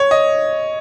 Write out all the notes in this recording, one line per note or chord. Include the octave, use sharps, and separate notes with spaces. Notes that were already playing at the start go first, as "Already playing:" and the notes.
Already playing: C#5
D#5